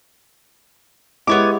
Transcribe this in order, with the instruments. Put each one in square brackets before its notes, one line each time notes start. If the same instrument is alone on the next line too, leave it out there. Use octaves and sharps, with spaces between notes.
[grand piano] G#3 E4 G4 [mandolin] B3 C#5 D6